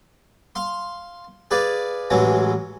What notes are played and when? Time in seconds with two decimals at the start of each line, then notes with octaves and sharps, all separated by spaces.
0.55 F5 C6
1.51 G#4 B4 D5 F5
2.10 A1 E3 F#3 G#3